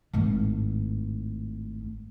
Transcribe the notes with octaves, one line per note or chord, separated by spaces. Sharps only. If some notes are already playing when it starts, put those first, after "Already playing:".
G#1 A2